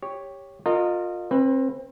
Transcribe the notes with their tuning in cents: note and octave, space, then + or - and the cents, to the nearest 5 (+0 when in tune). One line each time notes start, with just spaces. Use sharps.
G4 +10 C#5 +0
F4 +25 A#4 -25 D#5 -15
C4 +30 B4 +0